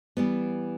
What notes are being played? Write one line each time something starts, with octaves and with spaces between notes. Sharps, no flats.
E3 G3 B3